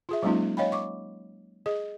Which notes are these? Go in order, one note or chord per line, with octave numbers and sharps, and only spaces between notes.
F4 G#4 E5
F#3 G#3 A#3 C#4 D#4 F4
C#5 D#5 F5 G5 B5
C#6 D6
G#4 D#5